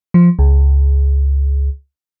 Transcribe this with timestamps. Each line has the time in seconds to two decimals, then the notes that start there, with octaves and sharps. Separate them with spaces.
0.14 F3
0.39 C#2